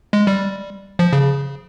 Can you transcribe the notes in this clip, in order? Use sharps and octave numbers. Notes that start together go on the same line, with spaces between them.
G#3
G3
F3
C#3